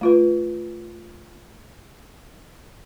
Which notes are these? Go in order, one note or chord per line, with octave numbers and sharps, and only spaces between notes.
A3 F4 B4